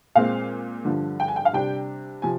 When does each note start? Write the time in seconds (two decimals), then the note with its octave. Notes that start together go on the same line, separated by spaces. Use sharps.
0.15 A#2 G#3 C4 F5
0.85 G2 D3 F3
1.20 G5
1.28 G#5
1.36 G5
1.45 F5
1.53 C3 G3 D4 G5
2.22 C3 F3 G#5